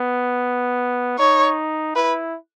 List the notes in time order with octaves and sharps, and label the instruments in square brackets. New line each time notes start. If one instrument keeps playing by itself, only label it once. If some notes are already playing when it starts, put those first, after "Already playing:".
Already playing: [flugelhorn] B3
[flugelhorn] D#4 [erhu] C#5
[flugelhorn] E4 [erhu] B4